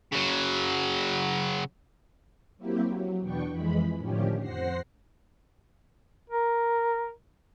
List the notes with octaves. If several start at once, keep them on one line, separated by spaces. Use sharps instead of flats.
C#3 F#3
F#3 A#3 C4 E4 G4
F#3
E2 B2 B3 D4 G5 C#6
F2 E3 G#3 B5
A2 D3 D#3 F3 C#4 G4
F2 C5 F#5 A#6 C7
A#4